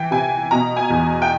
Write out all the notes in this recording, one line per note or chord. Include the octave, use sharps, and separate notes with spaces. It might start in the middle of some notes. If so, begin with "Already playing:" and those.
Already playing: E3 G5
C3 G#5
B2 A#5
G#5
E2
G5